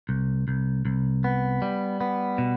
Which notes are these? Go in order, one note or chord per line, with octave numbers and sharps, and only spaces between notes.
C2
C2
C2
B3
G3
B3
B2